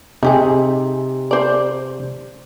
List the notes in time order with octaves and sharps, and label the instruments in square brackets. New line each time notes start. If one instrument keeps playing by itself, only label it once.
[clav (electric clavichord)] C3 [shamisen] D#4 G4 G#4
[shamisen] C5 D5